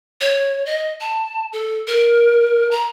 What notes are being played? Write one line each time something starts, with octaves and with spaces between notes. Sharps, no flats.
C#5
D#5
A5
A4
A#4
A#5